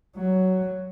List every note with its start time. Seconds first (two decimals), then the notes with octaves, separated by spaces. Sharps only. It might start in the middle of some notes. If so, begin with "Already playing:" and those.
0.16 F#3